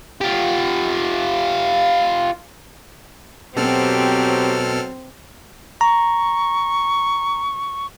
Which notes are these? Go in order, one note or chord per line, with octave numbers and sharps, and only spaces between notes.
F4 G4
B2 F#3 C4 G4 A4 F6
A#5 C#6